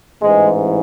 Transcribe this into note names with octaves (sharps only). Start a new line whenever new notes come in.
A1 G#2 E3 G#3